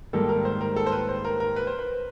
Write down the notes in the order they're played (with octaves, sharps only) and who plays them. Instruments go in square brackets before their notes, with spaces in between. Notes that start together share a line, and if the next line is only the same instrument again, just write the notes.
[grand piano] G#2 D#3 G3 A#3 A4
A#4
C5
A#4
A4
C5
B4
C5
A#4
A#4
B4
C5
B4